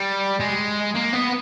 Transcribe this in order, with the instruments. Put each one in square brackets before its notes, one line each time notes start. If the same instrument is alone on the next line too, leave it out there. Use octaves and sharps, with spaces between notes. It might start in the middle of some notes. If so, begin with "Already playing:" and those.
Already playing: [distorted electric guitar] G3
G#3
A#3
B3